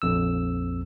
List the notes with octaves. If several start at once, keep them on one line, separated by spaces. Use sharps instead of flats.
A#1 F2 E6